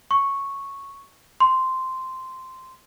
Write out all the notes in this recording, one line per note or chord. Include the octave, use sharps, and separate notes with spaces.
C#6
C6